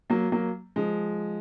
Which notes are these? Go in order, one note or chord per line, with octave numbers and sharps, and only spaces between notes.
F#3 A#3
F#3 A#3
F3 G#3